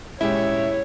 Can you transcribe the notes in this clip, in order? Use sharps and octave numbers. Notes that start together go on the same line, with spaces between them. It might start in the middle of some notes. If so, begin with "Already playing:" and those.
A#2 G#3 C#4 E4 G4 C#5 E5